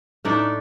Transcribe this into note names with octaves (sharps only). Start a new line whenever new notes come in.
A2 A3 D4 D#4 D5